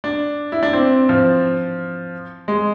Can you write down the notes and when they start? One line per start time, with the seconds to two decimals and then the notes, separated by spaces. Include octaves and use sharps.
0.04 D4
0.52 E4
0.63 D4
0.73 C4
1.09 F3
2.48 G#3